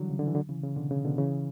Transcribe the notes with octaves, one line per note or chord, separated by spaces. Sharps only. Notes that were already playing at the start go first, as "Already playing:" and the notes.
Already playing: D3 E3 F#3 G3
C#3
D3
E3
D3 F#3
C#3 E3
C#3
B2 D3
C#3
B2 D3
C#3 E3